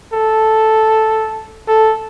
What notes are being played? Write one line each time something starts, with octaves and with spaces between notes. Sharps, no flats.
A4
A4